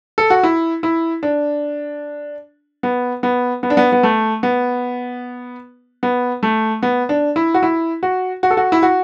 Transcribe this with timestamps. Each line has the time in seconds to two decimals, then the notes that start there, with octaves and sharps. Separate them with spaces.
0.18 A4
0.30 F#4
0.43 E4
0.83 E4
1.23 D4
2.83 B3
3.23 B3
3.63 B3
3.70 D4
3.77 B3
3.92 B3
4.03 A3
4.43 B3
6.03 B3
6.43 A3
6.83 B3
7.09 D4
7.36 E4
7.54 F#4
7.63 E4
8.03 F#4
8.43 F#4
8.50 A4
8.57 F#4
8.72 E4
8.83 F#4